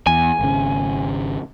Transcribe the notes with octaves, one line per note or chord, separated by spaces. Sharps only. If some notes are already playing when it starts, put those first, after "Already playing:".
E2 G#5
G#1 C#3